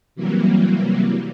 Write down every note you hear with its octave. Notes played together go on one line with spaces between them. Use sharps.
C3 E3 F#3 G3 A#3